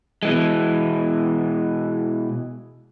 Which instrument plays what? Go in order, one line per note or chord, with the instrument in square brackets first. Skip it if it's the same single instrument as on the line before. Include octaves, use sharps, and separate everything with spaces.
[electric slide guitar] B2 E3 G#3